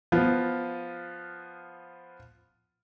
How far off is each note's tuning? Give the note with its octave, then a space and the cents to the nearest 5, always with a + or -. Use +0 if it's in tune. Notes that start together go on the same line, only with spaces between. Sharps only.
F3 +0 B3 +0 F4 +0